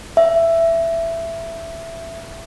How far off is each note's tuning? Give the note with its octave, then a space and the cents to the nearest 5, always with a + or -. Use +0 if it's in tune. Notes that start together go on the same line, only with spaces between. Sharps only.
E5 +10